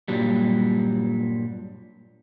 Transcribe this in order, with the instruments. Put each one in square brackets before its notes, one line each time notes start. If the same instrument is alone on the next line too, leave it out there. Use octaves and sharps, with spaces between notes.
[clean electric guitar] G2 A#2 F#3 G3